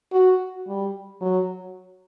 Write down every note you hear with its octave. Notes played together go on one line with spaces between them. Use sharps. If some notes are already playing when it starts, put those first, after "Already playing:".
F#4
G3
F#3